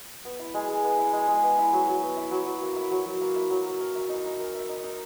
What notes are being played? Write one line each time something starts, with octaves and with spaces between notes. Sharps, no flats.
B3
E4
G#3
G#3
B3
E4
G#3
G#3
B3
E4
F#3
F#3
B3
E4
F#3
F#3
A#3
E4
F#3
F#3
A#3
E4
F#3
F#3
A#4
E5
D#4
D#4
A#4
E5
D#4
D#4